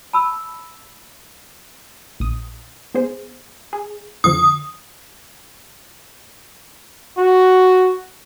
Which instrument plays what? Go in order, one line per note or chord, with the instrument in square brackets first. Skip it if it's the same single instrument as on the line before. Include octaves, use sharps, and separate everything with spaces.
[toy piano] A5 B5 E6
[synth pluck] A#1 D#6
B3 G#4 C5
G#4
[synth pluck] F2 D3 F3 [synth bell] D#6
[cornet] F#4